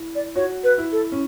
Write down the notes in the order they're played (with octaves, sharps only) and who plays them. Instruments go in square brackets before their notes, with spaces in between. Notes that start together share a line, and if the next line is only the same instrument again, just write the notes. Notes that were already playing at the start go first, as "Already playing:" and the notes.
Already playing: [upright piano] E4
[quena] D5
[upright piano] F#4 [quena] C#5
[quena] B4
[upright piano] E4
[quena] A4
[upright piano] C#4